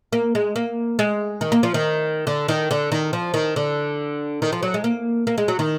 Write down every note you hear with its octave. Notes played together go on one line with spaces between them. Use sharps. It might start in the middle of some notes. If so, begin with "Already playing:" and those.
A#3
G#3
A#3
G#3
D#3
A#3
F3
D#3
D3
D#3
D3
D#3
F3
D#3
D3
D#3
F3
F#3
G#3
A#3
A#3
G#3
F#3
D#3